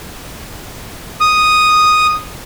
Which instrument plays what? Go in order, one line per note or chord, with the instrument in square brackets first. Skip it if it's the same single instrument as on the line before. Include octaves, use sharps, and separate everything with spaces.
[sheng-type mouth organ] D#6